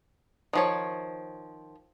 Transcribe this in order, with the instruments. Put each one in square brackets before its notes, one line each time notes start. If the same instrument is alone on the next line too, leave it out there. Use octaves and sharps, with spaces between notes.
[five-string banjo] D#3 F3 C#5